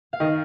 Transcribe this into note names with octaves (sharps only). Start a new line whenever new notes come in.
F5
D#3 D#5